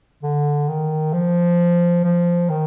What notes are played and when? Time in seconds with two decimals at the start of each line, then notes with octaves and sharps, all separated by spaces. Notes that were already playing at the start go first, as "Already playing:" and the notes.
0.23 D3
0.68 D#3
1.13 F3
2.04 F3
2.49 D#3